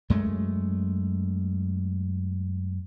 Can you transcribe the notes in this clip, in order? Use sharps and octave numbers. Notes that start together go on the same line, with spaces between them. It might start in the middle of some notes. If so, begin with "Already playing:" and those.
F#2 G#3 A3